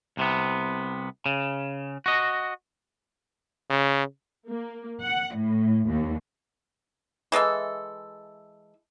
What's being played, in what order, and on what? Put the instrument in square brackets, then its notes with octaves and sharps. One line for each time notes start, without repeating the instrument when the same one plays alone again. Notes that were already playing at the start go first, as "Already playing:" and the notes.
[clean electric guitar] C2 C3 B3
C#3
F#4 D#5
[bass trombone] C#3
[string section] A#3
F#5
A2
D#2
[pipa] E3 G#3 A4 E5